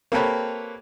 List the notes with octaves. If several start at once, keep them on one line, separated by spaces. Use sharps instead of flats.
A#3 C4 G4 A4 B4 C#5